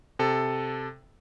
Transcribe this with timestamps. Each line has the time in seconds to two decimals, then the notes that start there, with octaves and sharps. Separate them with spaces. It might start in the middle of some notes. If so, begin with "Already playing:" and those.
0.19 C3 A4